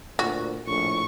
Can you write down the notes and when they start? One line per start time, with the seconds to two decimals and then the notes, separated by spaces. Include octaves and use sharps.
0.19 D2 A#2 F#4
0.68 A#1 A2 C#6